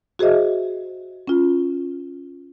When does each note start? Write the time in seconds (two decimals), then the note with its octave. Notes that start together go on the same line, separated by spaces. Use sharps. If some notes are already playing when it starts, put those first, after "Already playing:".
0.19 F#4 G#4 C5 D#5 E5
1.28 C#4 F4